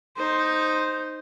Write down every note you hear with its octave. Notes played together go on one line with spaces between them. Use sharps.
D#4 C5